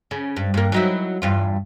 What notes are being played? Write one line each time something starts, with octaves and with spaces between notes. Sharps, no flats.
C#3
G2
G2 A#3
F#3 D#4 E4
E2 G2 F4